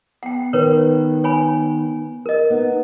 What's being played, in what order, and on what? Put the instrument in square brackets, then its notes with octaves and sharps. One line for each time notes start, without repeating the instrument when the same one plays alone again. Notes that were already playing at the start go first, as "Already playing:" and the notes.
[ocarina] B3 [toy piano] F#5 G5
[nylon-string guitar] D#3 [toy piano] A#4 B4 C#5
[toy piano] C#5 G#5 B5
A#4 D#5
[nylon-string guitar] B3 [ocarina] D#4